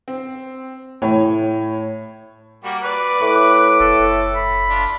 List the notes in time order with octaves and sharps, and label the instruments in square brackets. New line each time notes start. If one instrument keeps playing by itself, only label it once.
[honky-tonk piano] C4
[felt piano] A2 [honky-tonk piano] C#5
[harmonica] G3 A#3 F#4
[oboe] B4 [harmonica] D5
[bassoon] A2 [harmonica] D6
[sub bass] F#1 [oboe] A4
[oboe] B5
[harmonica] D4 F4